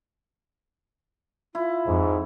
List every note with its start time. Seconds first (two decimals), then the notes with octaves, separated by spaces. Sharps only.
1.55 E4 F4
1.86 F2 G#2